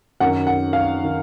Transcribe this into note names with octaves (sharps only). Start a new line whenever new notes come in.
F#2 D#3 F#5
F#5
F5
D#3